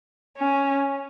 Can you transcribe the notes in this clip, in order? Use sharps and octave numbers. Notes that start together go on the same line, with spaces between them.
C#4